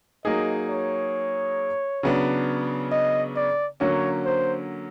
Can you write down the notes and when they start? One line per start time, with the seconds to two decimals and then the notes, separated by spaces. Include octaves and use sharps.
0.24 F#3 A#3 D#4 G#4 D#5
0.69 C#5
2.03 C#3 F#3 B3 D4
2.92 D#5
3.36 D5
3.80 D3 F#3 A#3 C#4 C#5
4.25 C5